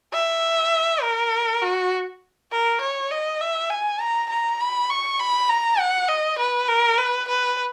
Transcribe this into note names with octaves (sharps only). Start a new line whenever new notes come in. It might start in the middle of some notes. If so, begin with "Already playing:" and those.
E5
A#4
F#4
A#4
C#5
D#5
E5
G#5
A#5
A#5
B5
C#6
B5
A#5
F#5
D#5
B4
A#4
B4
B4